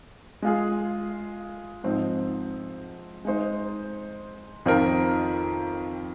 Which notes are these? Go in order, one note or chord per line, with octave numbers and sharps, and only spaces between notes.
G#3 F4 G#4
G#2 F3 C4 D#4
G#3 D#4 C5
F2 D#3 C4 F4 A#4